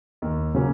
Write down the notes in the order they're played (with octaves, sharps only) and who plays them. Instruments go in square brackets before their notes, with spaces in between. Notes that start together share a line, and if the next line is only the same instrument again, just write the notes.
[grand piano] D#2
C#3 F#3 A#3 C#4